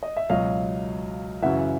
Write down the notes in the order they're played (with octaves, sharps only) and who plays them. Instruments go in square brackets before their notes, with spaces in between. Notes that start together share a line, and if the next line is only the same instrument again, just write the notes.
[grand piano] D#5
E5
C#2 B2 F#3 D#5 F5
F#2 C#3 E3 E5 F#5